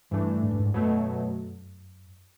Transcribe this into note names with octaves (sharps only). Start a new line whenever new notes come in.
G2 E3 A3 D4
G#2
G2
G#2
F#2 B2 F#3 A3